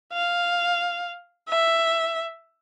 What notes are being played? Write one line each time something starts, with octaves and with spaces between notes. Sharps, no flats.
F5
E5